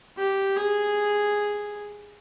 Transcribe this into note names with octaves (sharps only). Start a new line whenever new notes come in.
G4
G#4